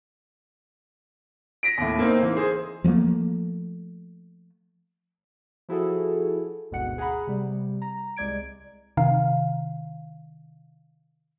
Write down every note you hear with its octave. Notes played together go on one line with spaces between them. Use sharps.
A#6 B6 D7
D#2 A2
A#3 C4 D#4
E3
G#4 C5
F3 G3 A3 A#3
F3 E4 F#4 G#4 A4
G#1 D2 G#2 B2 F#5 C#7
G#4 F#5 A#5 B5
C3 G3
A#5
C2 G#3 D5 G#6 D7
C3 D#3 F5